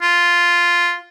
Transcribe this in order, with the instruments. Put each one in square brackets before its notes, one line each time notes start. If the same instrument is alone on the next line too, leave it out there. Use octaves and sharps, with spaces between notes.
[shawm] F4